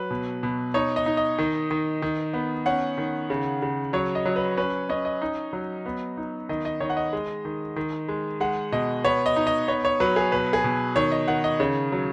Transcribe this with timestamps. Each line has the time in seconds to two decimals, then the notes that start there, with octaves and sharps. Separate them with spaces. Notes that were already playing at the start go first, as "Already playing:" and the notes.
Already playing: F#3 B4
0.11 B2
0.43 B2
0.74 D#4 C#5
0.96 D#5
1.06 D#4
1.17 D#5
1.39 D#3
1.71 D#3
2.02 D#3
2.33 B3
2.66 C#4 F#5
2.98 D#3
3.30 C#3
3.62 C#3
3.93 F#3 C#5
4.15 D#5
4.26 F#3
4.36 B4
4.57 C#4 B4
4.89 C#4 D#5
5.05 D#5
5.22 D#4
5.53 F#3
5.86 B3
6.17 D#4
6.49 D#3 D#5
6.65 D#5
6.80 D#3 C#5
6.90 F#5
6.97 D#5
7.13 G#3
7.45 D#3
7.76 D#3
8.09 G#3
8.40 G#3 F#5
8.72 B2 D#5
9.05 B3 C#5
9.26 D#5
9.36 D#4
9.47 D#5
9.68 B3 C#5
9.85 C#5
10.00 F#3 B4
10.16 G#4
10.32 B2 B4
10.53 G#4
10.64 B2
10.96 D#3 C#5
11.12 D#5
11.28 D#3 F#5
11.44 D#5
11.60 C#3 C#5
11.92 F#3